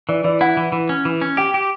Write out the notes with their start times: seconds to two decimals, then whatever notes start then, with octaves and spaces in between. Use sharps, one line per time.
0.09 E3 D5
0.24 E3 D5
0.41 E4 F#5
0.57 E3
0.72 E3
0.89 C#4
1.05 E3
1.21 C#4
1.37 G4 G5
1.54 G4